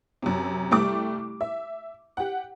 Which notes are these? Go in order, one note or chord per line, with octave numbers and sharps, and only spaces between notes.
F#2 C3
C2 G3 A3 G4 D6
E5
G4 F#5